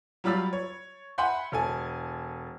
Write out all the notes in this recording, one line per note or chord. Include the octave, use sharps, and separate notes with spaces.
F#3 G3 F4 B5 E6 A6
C#5
E5 F#5 G#5 B5 C6 G6
E1 A4 G#5